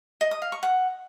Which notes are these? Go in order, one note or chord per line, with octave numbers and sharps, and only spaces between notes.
D#5
D#6
F5
C#6
F#5